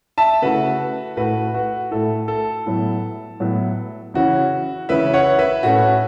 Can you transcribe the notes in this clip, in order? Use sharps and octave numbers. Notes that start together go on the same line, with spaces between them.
E5 A5
C#3 A3 E4 F#4 B4
A2 A3 E4 F#4 B4
F#4
A2 A3 E4 A4
A4
A2 F#3 B3 E4
A2 F#3 B3 E4
C#3 E3 C#4 E4 F#4
C#3 E3 C#4 E4 B4 E5
C#5 F#5
B4 E5
A2 A3 C#4 F#4